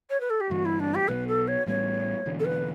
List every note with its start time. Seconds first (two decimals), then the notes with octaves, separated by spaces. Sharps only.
0.10 C#5
0.20 B4
0.30 A4
0.40 G4
0.50 G1 G2 E3 G3 F#4
0.65 E4
0.80 D4
0.94 G4
1.08 B1 B2 F#3 B3 B4
1.27 A4
1.47 C#5
1.66 A1 A2 G3 B3 C#5
2.26 E1 E2 D3
2.39 A4
2.45 B4